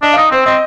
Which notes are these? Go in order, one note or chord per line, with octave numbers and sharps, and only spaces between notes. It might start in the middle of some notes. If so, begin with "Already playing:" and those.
D4 D#5
F5
D#4 D#5
C4 C5
C4 D#5